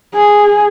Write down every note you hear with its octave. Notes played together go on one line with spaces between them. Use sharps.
G#4